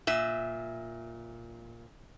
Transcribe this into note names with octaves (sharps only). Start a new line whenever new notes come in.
A#2 E5